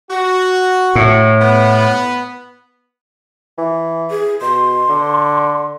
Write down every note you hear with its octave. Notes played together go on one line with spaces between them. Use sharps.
F#4
A2
B3
E3
G#4
B2 C6
D3